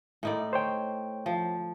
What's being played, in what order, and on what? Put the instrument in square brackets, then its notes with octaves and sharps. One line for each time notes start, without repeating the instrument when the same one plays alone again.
[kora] A2 D#4 D5
[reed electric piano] C5 C#5 G5
[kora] F3